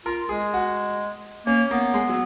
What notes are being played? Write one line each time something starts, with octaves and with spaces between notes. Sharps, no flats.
F4 A#4
G#3 G#4
F#4
A#3 C#4
A#3 B3
G#3
F#3